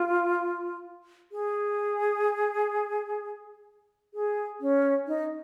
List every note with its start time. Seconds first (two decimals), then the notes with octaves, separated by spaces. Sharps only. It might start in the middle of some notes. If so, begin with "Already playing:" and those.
Already playing: F4
1.32 G#4
4.14 G#4
4.61 C#4
5.07 D#4